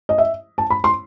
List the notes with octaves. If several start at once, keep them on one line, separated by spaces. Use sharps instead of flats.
D#5
E5
A5
B5
C6